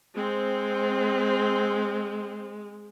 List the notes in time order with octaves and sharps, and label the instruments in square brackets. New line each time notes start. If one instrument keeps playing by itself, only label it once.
[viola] G#3 [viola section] C4